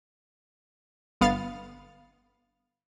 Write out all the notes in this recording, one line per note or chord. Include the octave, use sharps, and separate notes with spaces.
G1 B3 F5 A6